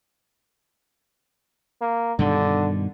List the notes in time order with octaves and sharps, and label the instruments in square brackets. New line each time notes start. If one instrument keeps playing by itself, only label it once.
[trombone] A#3
[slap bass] G2 B2 D#3 [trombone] D3